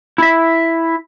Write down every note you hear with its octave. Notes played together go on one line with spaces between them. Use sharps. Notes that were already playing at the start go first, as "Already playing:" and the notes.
E4 E5